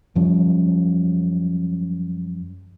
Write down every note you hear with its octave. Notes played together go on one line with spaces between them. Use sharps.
F#2 F3 G3 C#4